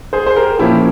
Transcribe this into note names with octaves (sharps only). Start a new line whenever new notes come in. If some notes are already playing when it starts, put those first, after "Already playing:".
G#4 C5
C5
G4 A#4
A#2 F3 A#3 C#4 E4 G4